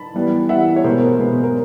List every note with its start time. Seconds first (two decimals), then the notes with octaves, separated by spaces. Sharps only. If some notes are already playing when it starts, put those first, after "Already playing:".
Already playing: A5 B5
0.14 E3 G3 B3
0.49 E3 G3 B3 E5 F#5
0.76 C#5
0.84 B2 G#3 B3 A#4 C5
1.19 B2 G#3 B3
1.44 A#4